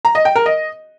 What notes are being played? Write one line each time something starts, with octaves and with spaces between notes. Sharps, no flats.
A#5
D#5
G5
A#4
D#5